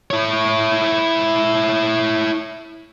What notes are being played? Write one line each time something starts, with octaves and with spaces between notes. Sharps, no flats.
E4 C#5